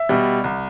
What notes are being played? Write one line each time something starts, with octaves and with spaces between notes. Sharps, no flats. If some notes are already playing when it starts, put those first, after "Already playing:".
Already playing: E5
B2 G3
C2